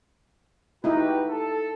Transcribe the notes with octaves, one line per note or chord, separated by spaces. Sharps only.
D#4 E4 F#4 G4 B4
A4